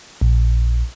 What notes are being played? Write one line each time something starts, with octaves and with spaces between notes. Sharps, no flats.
A#1